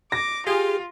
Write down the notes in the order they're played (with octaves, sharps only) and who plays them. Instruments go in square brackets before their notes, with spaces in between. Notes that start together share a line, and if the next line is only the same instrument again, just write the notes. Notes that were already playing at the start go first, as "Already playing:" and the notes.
[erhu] D6 [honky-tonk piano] A#6
[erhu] F4 [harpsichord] G4 F5 [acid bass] G#4